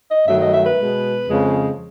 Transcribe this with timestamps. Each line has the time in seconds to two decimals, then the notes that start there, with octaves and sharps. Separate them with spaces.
0.09 D#5
0.26 G2 D#3 F#3 A3 E5
0.39 D#5
0.52 E5
0.64 B4
0.78 B2 G#3
1.29 F2 C#3 F3 G#3